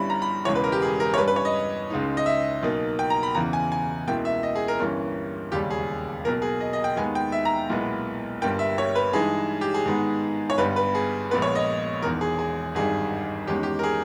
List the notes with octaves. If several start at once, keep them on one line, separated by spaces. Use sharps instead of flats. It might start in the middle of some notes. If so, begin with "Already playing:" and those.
Already playing: G1 G2 G3 C#4 E4 B5
A#5
B5
E1 E2 C#3 E3 G#3 C#5
B4
A#4
G4
G#4
A#4
C#5
G2 G3 C#4 B4
B4
C#5
D#5
C#2 C#3 G#3 D#4
D#5
E5
B1 B2 A#3 D#4
G5
A#5
B5
E2 C#3 E3 A#5
G#5
G#5
C#2 B2 A#3 E4 G5
E5
D#5
G#4
A#4
G1 G2 E3 A#3 C#4
E1 D#2 C#3 G3 C#4 G4
G#4
B1 B2 A#3 A#4
G#4
D#5
D#5
G5
D#2 D#3 G#3 B3 D#4 G#5
G5
E5
A#5
B1 A#2 G#3 B3 E4
G1 G2 G3 A#3 G5
E5
C#5
B4
G2 E3 G#3 D#4 G#4
G4
G#4
G#2 D#3 G#3 B3 D#4
C#5
G1 G2 G3 B3 B4
B4
G#4
A#1 A#2 G#3 B3 B4
C#5
D#5
E1 E2 D#3 A#4
G#4
G#4
G#1 G2 D#3 G3 G#4
E2 D#3 G#3 C#4 G4
G4
A#4
G#4